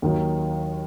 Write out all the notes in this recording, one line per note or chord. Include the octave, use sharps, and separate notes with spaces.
D#2 D#3 F#3